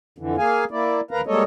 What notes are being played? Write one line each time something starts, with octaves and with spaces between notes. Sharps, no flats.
F2 D3 E3
A#3 G#4 F5 G#5
A#3 E4 D5
D#2 A#4 B4 F5 A#5
G3 G#3 A#3 A4 C#5 D#5